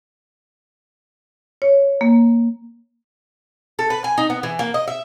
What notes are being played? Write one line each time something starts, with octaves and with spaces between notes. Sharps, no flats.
C#5
A#3
A4
B4
G#5
D#4
B3
E3
A#3
D#5
E5